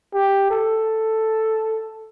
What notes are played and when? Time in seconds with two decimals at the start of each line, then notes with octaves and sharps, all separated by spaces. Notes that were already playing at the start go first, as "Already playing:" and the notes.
0.14 G4
0.51 A4